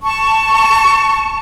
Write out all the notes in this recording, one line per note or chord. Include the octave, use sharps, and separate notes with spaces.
A5 C#6